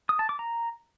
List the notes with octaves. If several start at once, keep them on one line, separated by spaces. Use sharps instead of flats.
D#6
A5
D6
A#5